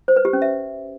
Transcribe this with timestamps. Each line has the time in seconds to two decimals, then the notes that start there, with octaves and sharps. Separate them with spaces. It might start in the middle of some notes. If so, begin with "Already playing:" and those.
0.08 C5
0.16 B4
0.25 G4
0.33 C#4
0.42 E5